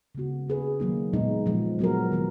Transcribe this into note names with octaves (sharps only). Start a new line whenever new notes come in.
C#3 G#3 B3 F#4
A#3 C#4 G#4 B4
D#3 F#3 A#3 D#4
A#2 G#3 B3 D#4
A#2 F3 G#3
F#3 B3 F#4 A#4
D#3 F#3 B3